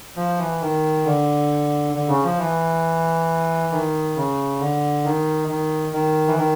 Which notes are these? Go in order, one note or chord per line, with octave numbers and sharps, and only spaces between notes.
F3
E3
D#3
D3
D3
C#3
F3
E3
D#3
C#3
D3
D#3
D#3
D#3
E3
D#3